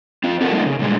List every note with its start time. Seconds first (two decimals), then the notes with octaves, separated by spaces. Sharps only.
0.24 C4 F4
0.41 F4 G4 A4 A#4 F#5
0.53 G3 A3 A#3 C4 D#4
0.66 C#3
0.79 A#2 G3 G#3